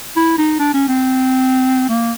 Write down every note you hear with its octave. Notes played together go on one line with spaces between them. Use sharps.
E4
D#4
D4
C#4
C4
A#3